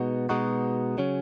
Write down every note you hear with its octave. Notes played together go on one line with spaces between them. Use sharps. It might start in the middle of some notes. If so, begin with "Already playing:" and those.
Already playing: B2 G#3 B3 D#4 F#4
B2 G#3 B3 D#4 F#4
C#3 F#3 C#4